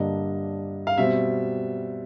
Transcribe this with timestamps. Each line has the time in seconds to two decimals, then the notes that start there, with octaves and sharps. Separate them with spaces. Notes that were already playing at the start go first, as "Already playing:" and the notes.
Already playing: G2 D3 G3 A#3 D4 D#5
0.87 F5
0.98 B2 G3 C4 E5